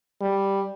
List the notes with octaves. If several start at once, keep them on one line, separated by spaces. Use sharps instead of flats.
G3